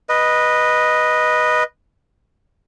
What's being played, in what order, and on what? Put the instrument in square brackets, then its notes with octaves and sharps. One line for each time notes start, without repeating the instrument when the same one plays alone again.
[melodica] B4 D#5